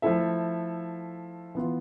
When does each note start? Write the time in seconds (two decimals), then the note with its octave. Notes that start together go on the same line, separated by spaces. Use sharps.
0.02 F3 A3 E4 A4 E5
1.55 E3 B3 F4